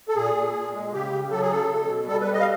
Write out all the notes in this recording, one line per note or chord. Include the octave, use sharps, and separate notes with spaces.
A4
A#2 G#4
A#2
A#2
G#3
C#3 G4
C#3
F#3 A4
G#4
C#3 A4
B2
B2
G3 A4
B4
G3
D#5
F5